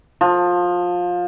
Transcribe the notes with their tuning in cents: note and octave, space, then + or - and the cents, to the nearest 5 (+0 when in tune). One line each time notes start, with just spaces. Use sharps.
F3 +20